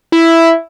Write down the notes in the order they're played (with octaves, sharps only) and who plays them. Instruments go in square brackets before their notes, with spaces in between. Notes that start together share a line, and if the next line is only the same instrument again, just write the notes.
[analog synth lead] E4